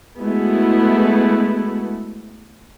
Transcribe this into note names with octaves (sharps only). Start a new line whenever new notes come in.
G#3 A3 B3 E4 F#4